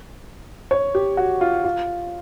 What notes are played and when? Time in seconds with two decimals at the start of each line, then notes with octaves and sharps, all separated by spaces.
0.71 C#5
0.95 G4
1.17 F#4
1.41 F4
1.64 F4